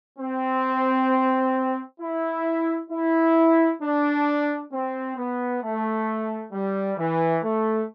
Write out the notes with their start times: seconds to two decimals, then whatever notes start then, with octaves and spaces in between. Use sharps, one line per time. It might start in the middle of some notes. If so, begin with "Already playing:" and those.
0.19 C4
2.01 E4
2.90 E4
3.81 D4
4.72 C4
5.17 B3
5.62 A3
6.52 G3
6.97 E3
7.43 A3